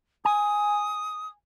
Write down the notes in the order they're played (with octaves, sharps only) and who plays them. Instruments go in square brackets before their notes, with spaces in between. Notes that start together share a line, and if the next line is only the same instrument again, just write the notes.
[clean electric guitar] G#5 [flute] D#6